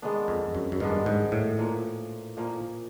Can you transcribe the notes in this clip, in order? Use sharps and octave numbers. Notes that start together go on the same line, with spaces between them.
D#3 G#3 B3 D4
F2
F#2
F#2
G2 D#3 G#3 B3 D4
G#2
A2
A#2 F3 A#3
A#2 F3 A#3